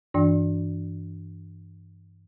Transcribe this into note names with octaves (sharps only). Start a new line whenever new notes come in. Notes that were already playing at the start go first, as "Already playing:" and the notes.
G2 E3 D4 D5